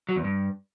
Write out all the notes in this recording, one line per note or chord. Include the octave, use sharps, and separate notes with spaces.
F#3
E2
G2